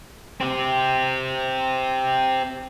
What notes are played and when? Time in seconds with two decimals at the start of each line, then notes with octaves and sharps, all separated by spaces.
0.41 C4 G4